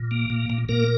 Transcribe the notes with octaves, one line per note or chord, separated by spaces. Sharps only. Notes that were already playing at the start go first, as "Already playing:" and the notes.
Already playing: A#2
A#3
A#2
A#2
A#2 A#3 A#4